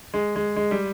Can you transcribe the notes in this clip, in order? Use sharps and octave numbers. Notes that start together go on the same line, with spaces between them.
G#3
G#3
G#3
G3